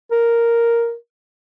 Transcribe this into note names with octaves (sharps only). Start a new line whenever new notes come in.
A#4